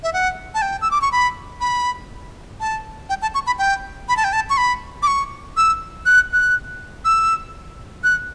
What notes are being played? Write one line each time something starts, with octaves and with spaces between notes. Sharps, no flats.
E5
F#5
A5
G5
E6
D6
C#6
B5
B5
A5
G5
A5
C#6
B5
G5
B5
A5
G5
A5
C#6
B5
D6
C#6
E6
F#6
F#6
E6
F#6